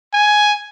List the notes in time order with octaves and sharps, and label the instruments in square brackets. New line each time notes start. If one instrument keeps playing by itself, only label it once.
[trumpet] G#5